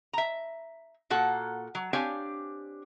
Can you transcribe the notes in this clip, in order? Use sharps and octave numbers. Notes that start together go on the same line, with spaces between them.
E5 A#5
A#2 A#3 F#4 A4 F#5
F#3
C4 D4 G4 C#5 F5 G#5